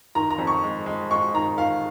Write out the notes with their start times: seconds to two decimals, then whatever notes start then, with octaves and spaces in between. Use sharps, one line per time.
0.15 D#3 A#5
0.30 A#5
0.38 F2
0.47 C#6
0.63 G#3
0.86 G#3
1.11 G#3 C#6
1.34 D#3 A#5
1.57 D#3 F5